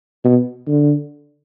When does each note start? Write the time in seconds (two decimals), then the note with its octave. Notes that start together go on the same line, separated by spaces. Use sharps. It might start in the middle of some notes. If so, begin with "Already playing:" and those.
0.25 B2
0.67 D3